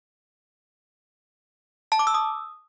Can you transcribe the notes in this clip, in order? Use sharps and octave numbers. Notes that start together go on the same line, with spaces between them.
A5
D6
E6
D#6